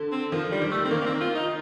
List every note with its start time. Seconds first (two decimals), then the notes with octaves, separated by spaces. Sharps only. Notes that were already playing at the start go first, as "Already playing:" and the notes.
Already playing: D3
0.12 C4
0.32 D#3 F3
0.52 G3
0.62 D#3
0.71 A3
0.85 C4
0.91 D#3 A#3
1.01 A#3
1.06 C4
1.21 F4
1.36 D#4